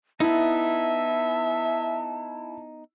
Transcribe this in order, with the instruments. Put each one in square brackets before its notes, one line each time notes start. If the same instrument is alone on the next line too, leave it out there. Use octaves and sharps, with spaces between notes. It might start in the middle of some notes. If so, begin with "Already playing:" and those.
[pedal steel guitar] B3 D#4 [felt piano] E4 [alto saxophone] E5 [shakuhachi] A5